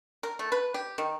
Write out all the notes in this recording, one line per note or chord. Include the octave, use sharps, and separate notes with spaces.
A#4
A3
B4
G4
D#3